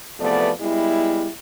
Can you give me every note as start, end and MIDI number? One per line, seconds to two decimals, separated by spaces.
0.19 0.51 40
0.19 0.51 48
0.19 0.51 53
0.19 0.51 57
0.19 0.51 59
0.19 0.51 74
0.61 1.28 55
0.61 1.28 56
0.61 1.28 59
0.61 1.28 64